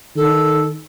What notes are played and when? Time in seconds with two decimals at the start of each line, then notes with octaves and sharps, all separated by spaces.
0.16 D#3 A4